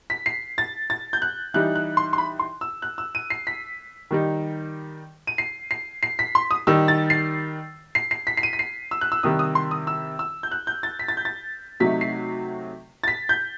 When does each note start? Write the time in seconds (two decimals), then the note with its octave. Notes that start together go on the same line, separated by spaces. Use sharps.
0.10 B6
0.26 C7
0.58 A6
0.90 A6
1.13 G6
1.22 F#6
1.54 E3 G3 D#4 F#6
1.75 F#6
1.97 C6
2.13 C6
2.18 B5
2.39 C6
2.61 E6
2.82 F#6
2.98 E6
3.15 D#7
3.30 C7
3.47 B6
4.11 D#3 G3 D#4
5.27 D#7
5.38 C7
5.71 C7
6.03 C7
6.19 B6
6.35 C6
6.51 D#6
6.67 D#3 G3 D#4 E6
6.88 A6
7.10 C7
7.95 C7
8.11 C7
8.27 B6
8.37 C7
8.43 D#7
8.53 B6
8.59 C7
8.91 E6
9.01 F#6
9.12 E6
9.23 C3 D#3 G3 D#6
9.39 D#6
9.55 C6
9.71 D#6
9.87 E6
10.19 E6
10.43 G6
10.51 F#6
10.67 G6
10.83 A6
10.99 B6
11.08 A6
11.17 G6
11.25 A6
11.80 C3 F#3 A3 D#4 B6
12.01 C7
13.04 A6
13.08 B6
13.29 G6